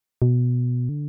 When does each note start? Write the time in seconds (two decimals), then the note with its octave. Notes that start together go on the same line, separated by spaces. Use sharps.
0.22 B2
0.89 D3